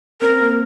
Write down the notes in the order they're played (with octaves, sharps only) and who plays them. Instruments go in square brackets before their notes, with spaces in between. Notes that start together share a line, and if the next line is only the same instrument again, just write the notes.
[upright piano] C4 [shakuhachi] A#4
[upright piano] A#3